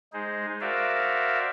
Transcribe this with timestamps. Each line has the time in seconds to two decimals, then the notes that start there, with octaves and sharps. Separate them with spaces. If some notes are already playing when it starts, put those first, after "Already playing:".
0.13 G#3 D#4 G#4 C5
0.61 F#4 A#4 C5 D5 E5 F5